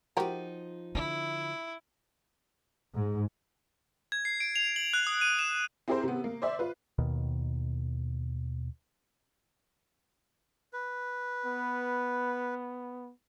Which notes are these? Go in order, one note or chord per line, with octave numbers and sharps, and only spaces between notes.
F3 D#4 F#4 G4 A#4
D3 E4
G#2
G#6
C7
D7
F7
F#7
F#6
D#6
D#7
E7
C4 E4 G4 G#4 A#4 C5
C3 B3
A#3
C5 D5 E5
F4 B4
D#2 B2 D#3
B4
B3